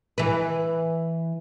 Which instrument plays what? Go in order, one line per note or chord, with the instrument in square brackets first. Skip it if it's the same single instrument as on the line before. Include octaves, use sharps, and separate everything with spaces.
[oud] E3 B4